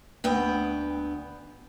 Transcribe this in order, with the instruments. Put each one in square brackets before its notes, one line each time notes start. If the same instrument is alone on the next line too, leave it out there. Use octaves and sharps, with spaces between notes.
[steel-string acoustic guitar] D2 B3 G5